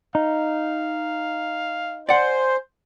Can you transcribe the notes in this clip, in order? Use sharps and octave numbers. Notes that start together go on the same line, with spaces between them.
D#4 F5
C5 D5 F#5 G#5